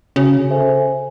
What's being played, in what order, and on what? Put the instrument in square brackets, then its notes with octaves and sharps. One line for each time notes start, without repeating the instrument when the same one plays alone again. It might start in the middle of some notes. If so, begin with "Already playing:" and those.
[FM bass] C#3 [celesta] F#4
[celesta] A4 C5 E5 G#5